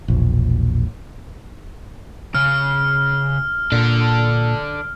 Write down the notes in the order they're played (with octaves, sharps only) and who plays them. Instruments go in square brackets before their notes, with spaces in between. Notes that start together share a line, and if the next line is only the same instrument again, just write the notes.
[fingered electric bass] E1 A#1
[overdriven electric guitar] C#3 [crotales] F6
[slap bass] A#2 [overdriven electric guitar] D4 A4